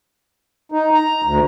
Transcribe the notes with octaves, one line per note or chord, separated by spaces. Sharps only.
D#4
A#5
D2